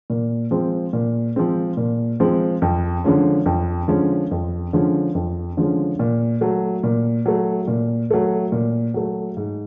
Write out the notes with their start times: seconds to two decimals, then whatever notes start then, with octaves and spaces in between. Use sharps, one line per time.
0.10 A#2
0.51 F3 G#3 C4
0.93 A#2
1.36 F3 G#3 C4
1.77 A#2
2.20 F3 G#3 C4
2.62 F2
3.04 D3 F3 G#3 C#4
3.46 F2
3.88 D3 F3 G#3 C#4
4.31 F2
4.73 D3 F3 G#3 C#4
5.15 F2
5.57 D3 F3 G#3 C#4
5.99 A#2
6.41 F#3 A3
6.84 A#2
7.26 F#3 A3
7.68 A#2
8.11 F#3 A3
8.52 A#2
8.94 F#3 A3
9.37 G#2